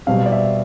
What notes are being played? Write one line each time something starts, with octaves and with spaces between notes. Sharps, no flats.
B2 G3 C4 F5
D5
E5